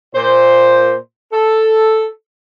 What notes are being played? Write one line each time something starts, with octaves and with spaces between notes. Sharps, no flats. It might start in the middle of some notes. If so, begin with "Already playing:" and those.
A#2 C5
A4